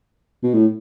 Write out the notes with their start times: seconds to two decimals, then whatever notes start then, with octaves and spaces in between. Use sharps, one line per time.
0.43 B2
0.54 A2